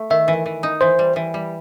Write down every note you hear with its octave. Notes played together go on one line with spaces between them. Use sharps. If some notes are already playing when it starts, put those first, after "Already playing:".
Already playing: A3
D#3 E5
E3
E3
D#4
E3 C5
G3
E3
G3